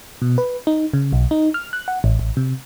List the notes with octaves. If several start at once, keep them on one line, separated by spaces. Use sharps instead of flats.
B2
B4
D#4
C#3
B1
D#4
F6
F#6
F#5
A1
A1
C3